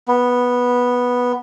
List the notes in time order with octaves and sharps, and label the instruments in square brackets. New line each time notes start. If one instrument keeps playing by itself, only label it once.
[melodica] B3